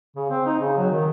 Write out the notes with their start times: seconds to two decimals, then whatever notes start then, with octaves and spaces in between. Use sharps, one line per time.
0.16 C#3
0.30 C4
0.46 D#4
0.59 C#3
0.77 F#3
0.90 D#3